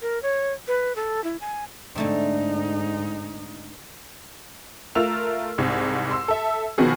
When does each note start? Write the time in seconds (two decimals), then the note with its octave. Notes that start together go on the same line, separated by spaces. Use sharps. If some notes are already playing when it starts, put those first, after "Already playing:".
0.02 A#4
0.22 C#5
0.68 B4
0.96 A4
1.24 E4
1.41 G#5
1.95 G#2 D3 A3 C4 D#4
4.95 A3 F4 A#4 E6 F7
5.58 C2 G#2
6.11 C6 E6
6.28 A4 E5
6.78 B2 D#3 F3 B3 F#4 G#4